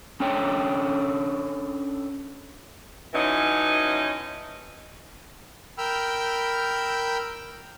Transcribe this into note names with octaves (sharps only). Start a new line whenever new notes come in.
C#4 D4 A4 C#5 G5
D3 E3 F#3 C#4 D#4
A#4 G5 B5 E6 F6 G6